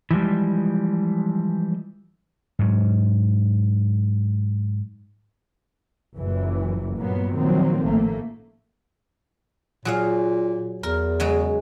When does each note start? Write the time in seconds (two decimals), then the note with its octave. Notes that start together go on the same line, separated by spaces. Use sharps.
0.11 E3 F3 G3 G#3
2.59 G#2 F#3
6.17 F#1 A#2 E3
6.98 G2 A#2 F#3 A#3 B3
7.36 A#2 D#3 F3 F#3 A#3 C4
7.86 A1 A3 A#3
9.85 A#2 F#3 G#4 F5
10.83 E2 A#4
11.20 C#3 F#3 G#3